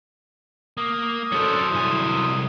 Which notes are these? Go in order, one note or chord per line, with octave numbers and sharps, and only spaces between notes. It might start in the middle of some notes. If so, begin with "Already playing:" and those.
A#3 D#6
F#3 C#4 D4 A4 C5
C2 E4 G#5